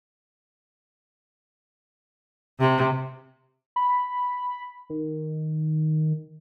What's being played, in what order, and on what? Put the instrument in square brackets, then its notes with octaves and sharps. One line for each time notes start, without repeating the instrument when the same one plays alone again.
[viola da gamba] C3
[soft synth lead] B5
D#3